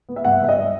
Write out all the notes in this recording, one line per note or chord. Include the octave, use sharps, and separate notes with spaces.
B3
E5
G2 F#5
G2 E5
D#5